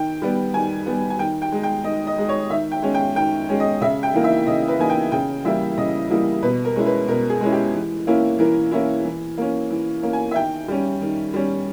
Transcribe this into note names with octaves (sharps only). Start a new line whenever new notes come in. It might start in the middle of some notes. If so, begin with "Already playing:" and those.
Already playing: D#3 G5
G3 B3
D#3 G#5
G3 B3
G#5
D#3 G5
G5
G#3 D#4
G5
D#3 D#5
D#5
G#3 D#4
C#5
D#3 E5
G5
G#3 C#4
G5
D#3 G5
G#3 C#4
D#5
C#3 E5
G5
E3 A#3 D#4
E5
C#3 D#5
B4
E3 A#3 D#4 G#5
G5
C#3 G5
E3 G3 A#3 E4 E5
C#3 D#5
E3 G3 A#3 E4
B2 B4
A#4
G#3 C#4 E4
B4
B2 A#4
G#4
G#3 C#4 E4
G4
E3
A#3 C#4 E4
E3 A#4
A#3 C#4 E4
E3
A#3 C#4
E3
A#3 C#4
G#5
E5
D#3 G5
G3 C#4
D#3
G3 C#4